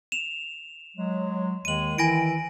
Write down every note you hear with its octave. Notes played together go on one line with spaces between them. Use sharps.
E7 F7
F#3 G#3
D#2 D#3 G#3 D#7 F#7
D#3 E3 E4 G#5 A#6 D7